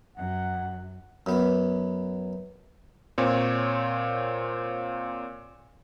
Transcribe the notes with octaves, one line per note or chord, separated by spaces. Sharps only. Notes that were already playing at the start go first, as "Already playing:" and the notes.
F#2 F#5
F#2 B3
A#2 C4 C#5